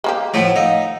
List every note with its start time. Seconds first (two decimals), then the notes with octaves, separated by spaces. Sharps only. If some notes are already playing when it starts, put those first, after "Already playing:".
0.04 G#3 A#3 G4
0.34 A2 F3 A3 F#5
0.56 D#4 F5 E6